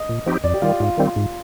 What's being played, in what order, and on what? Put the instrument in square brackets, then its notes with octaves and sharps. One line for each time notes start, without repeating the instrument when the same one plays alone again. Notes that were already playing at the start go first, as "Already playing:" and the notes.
Already playing: [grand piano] D#5
[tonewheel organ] A#2
F3 C4 D#4 G4
[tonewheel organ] F2 [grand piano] D5
[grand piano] G4
[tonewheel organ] D#3 G3 [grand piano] F4
[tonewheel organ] G#2 [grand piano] F4
[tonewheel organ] D#3 G3 C4
G#2